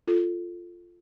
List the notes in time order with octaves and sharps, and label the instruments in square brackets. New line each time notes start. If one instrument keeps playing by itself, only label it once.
[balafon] F4 A4